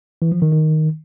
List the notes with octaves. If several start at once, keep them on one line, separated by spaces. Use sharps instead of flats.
E3
F3
D#3
D#3